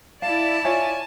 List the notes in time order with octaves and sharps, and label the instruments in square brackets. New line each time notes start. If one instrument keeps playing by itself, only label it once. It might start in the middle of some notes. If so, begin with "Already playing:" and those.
[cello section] E4 D5 [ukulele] F5 [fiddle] A5
[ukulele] F4 C#5 E5 [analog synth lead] G#5